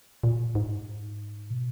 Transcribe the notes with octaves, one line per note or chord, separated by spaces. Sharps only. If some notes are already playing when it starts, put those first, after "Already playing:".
A#2
G#2
B2